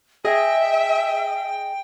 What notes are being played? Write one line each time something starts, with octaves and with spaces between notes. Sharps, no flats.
G#4 D#5 E5 G5